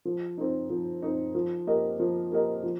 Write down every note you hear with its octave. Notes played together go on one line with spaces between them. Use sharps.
F3
C4 D#4
F3
C4 D#4
F3
A#3 G4 A#4 D#5
F3
A#3 G4 A#4 D#5
F3